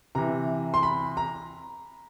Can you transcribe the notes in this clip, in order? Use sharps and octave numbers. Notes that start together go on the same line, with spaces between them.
C3 E3 A#5
C6
B5
A#5